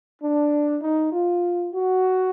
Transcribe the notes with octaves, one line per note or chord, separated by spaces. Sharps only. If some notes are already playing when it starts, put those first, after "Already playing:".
D4
D#4
F4
F#4